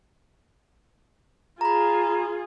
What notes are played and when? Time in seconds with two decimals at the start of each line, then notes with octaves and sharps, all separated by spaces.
1.61 F4 G#4 A#5 B5